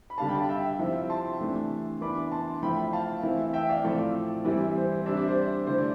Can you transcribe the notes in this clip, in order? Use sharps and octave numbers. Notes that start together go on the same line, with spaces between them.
B5
D3 G3 D4 F5 A5
G5 B5
F5 A5
E5 G5
C3 F3 C4 E4
A5 C6
C3 E3 A3 D4
E3 B3 D4 B5 D6
A5 C6
F3 A3 E4 G5 B5
F5 A5
E3 A3 C4 E4
E5 G5
D5 F5
A2 F3 A3 C4 E4 D5
E3 G3 C4 E4
C5
C5
C3 G3 D4 E5
D5
C5
D5
D3 A3 E4 C5
D5